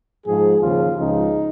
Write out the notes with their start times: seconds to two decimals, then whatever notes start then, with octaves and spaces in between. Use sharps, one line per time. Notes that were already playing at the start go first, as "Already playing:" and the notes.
0.26 G#2 F3 G#4
0.61 D#2 C#3 F3 F4
0.97 C#2 C#3 F3 D#4